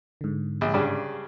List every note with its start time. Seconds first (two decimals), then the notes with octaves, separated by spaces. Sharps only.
0.21 G#2 D3
0.61 A#1
0.74 G2 C#3 D4